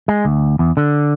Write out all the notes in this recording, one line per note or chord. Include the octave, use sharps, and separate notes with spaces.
G#3
D2
E2
D3